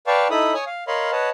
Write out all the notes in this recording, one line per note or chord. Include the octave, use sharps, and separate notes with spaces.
B4 D5 F5 G5 A5 C#6
D#4 E4 A4 B5 D#6
C#5 G#5 C#6 D#6
F5
A#4 C#5 D#5 F5 B5 C6
B4 C#5 D#5 F#5 A5